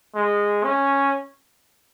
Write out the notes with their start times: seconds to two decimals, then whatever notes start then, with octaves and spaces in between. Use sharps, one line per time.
0.15 G#3
0.64 C#4